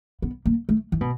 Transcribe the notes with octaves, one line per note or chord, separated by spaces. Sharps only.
B3
A#3
A3
E3
B2